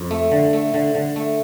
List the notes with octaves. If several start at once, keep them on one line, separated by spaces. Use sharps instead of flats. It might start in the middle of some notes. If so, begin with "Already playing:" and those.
Already playing: F2
A3
D3
A3
D3
D3
A3